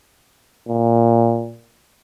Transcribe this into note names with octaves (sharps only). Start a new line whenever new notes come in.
A#2